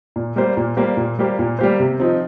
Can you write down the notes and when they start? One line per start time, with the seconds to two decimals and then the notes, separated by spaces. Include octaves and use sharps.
0.16 A#2
0.36 G3 A#3 G4 C5
0.57 A#2
0.77 G3 A#3 G4 C5
0.97 A#2
1.19 G3 A#3 G4 C5
1.39 A#2
1.59 G3 A#3 G4 C5
1.80 C3
2.00 F3 C4 D#4